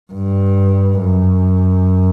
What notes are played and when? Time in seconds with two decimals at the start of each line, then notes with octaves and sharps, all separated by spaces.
0.13 G2
1.01 F#2